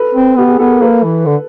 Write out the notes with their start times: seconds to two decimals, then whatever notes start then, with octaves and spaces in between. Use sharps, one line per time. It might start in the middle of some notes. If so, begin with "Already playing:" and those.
Already playing: A4 B4
0.14 C4
0.36 B3 G4
0.48 G#4
0.59 B3 A4
0.70 A#4
0.81 A#3 A4 B4
1.04 E3
1.26 D3